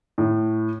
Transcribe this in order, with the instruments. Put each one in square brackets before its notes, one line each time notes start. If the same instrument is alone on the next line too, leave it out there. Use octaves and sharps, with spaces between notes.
[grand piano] A2